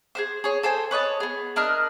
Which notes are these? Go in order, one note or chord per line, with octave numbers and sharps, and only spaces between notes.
G#4 B4 C5
G#4 C#5
A4 C5 G5 G#5
B4 C#5 D#5 A5
B3 G#4
D4 A#4 D#5 F6